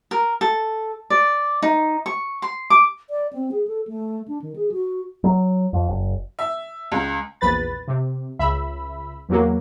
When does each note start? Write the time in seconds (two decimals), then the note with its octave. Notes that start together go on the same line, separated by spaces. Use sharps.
0.11 A#4
0.41 A4
1.10 D5
1.62 D#4
2.06 C#6
2.42 C6
2.70 D6
3.10 D5
3.33 C4
3.51 G#4
3.67 A4
3.88 A3
4.28 D4
4.42 D#3
4.56 G#4
4.72 F#4
5.24 F#3
5.73 F2
5.88 F#1
6.39 E5
6.92 C#2
7.41 A#1 E2 B4 B5 A6
7.88 C3
8.39 C#2 E5 B5
9.29 E2 E3 F#3 A#3